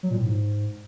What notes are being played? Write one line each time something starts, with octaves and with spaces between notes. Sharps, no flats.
F#3
A#2
A2
G#2